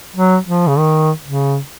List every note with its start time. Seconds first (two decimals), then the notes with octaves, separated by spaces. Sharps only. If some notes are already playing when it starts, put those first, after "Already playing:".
0.16 F#3
0.47 F3
0.68 C#3
0.78 D#3
1.25 C#3